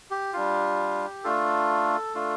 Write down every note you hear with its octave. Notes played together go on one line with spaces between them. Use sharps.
G4
G3 D4 F4
A3 D4 F4 A4
A3 D4 F4